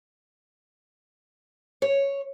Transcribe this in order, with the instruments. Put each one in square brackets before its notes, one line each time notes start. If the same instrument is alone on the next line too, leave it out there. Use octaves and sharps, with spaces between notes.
[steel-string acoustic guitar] C#5